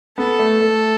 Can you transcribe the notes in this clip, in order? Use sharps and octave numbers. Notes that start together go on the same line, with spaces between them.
B3 A4
A3
A3